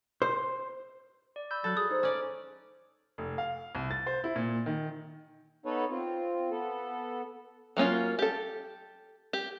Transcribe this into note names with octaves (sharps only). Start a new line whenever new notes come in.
C5
D5
B5 E6 G6
F#3 A4 F#6 A6
G#4 D#6
D#4 C5
C#4 D5
F1
F5
C2
A6
C5
E4
A#2
D#3
B3 D#4 A4 B4 C#5
C4 F4
B3 A4
F#3 A#3 C#4 F4
G4 A4
G4